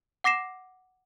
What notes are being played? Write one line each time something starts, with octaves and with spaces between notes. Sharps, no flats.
F#5 D6 A#6 C7 E7